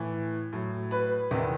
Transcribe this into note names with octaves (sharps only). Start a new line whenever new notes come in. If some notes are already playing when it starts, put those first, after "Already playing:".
Already playing: A2 E3
A2 F#3
B4 B5
E2 C3 D#3